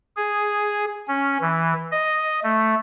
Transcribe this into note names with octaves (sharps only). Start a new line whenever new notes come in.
G#4
C#4
E3
D#5
A3